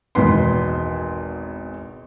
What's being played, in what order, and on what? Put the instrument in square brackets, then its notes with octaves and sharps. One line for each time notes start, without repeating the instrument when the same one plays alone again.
[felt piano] G#1 E2 B2 B4 C6